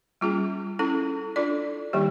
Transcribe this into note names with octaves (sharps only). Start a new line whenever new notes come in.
G3 A#3 C#4 F4 G#4
C#4 E4 A4
D4 F4 A4 D5
D#3 G3 A#3 D#4 G4